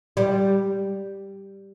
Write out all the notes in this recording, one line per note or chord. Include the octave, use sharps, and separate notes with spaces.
G3